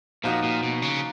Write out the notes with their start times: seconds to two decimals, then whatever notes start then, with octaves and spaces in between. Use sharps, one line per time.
0.24 A#2 F3 A#3 D#4 F#4
0.43 A#2
0.63 B2
0.82 C#3